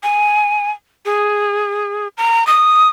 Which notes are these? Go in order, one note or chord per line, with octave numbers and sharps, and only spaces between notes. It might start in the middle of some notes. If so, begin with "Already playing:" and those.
G#5
G#4
A#5
D#6